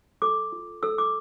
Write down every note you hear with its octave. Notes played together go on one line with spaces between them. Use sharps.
A4 D6
F4
A4 E6
D6